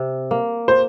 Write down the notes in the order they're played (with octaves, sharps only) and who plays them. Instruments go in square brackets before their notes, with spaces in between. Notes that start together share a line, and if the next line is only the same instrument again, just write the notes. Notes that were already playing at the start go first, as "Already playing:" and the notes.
Already playing: [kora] C3
A#3
[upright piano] C5